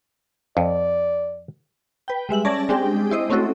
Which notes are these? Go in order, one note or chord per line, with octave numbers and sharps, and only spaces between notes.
F2 D5
B4 G5
G3 G#3 E5 F#7
C#4 D5 A5 G#6 A#6
G#3 C4 D4 G4 G#4 G5
E4 C5 D#5
A3 C4 C#4 E4 F#4 A4